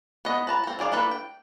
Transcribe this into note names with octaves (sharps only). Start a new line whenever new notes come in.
B3 D#5
B4 A5 A#5
C4 A4
D#3 G#4 D5 F5
A#3 D4 A4 B4
G5